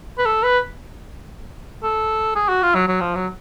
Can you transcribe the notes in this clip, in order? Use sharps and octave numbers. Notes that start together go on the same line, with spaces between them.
B4
A4
B4
A4
G#4
F#4
F4
F#3
F#3
F3
F#3